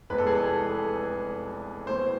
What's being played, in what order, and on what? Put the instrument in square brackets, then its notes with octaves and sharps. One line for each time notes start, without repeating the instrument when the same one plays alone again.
[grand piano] F1 E2 C3 E3 G#3 B4
A4
G#4
A4
B1 A2 E3 C5